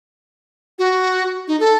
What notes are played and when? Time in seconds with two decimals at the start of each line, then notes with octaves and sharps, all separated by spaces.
0.79 F#4
1.48 D#4
1.60 A4